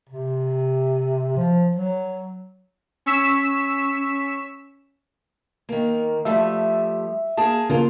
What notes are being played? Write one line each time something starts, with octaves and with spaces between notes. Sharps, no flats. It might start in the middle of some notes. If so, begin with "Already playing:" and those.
C3
F3
F#3
C#4 C#6 E6 B6 E7
D#3 A#3
F3 G3 A3 E5
A#3 G#4 A5
C#3 A#3 F4